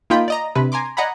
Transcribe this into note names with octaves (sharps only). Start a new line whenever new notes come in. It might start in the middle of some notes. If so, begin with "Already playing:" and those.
A#3 D#4 F4 G5 B5
D5 D#5 A#5
C3 D4 B4
G#5 A#5 C6 D6
D5 D#5 F#5 G#5 A#5 B5